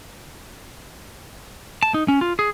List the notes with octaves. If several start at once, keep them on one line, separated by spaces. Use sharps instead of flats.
A5
D#4
C#4
F4
G#4